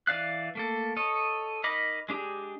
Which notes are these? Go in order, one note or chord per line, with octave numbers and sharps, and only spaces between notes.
E3 D5 F5 F#6
A3 A#3 A4
A4 C#5 D#5
D#4 A#4 D#5 B5 D6
G#3 D4 G4 G#4